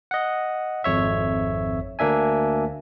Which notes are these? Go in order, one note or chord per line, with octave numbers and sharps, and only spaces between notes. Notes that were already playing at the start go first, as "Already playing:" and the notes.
D#5 F#5
G#1 F2 C#5 E5
D2 A#3 D4 E5 G#5